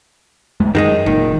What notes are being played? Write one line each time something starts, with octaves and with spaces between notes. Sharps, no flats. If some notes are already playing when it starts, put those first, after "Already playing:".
F#2 G#3 A3
F#2 D#3 G#3 D#4
F#1 A#2 D#3